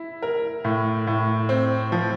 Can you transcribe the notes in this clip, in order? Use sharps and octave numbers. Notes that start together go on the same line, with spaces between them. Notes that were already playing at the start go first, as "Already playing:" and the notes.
Already playing: E4
A#4
A2
A2
C4
F3